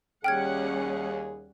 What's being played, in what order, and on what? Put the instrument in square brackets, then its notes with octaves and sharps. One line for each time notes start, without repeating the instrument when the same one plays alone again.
[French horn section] D#2 G#4 [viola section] G3 C#4 F#5 [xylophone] G5 F6 G#6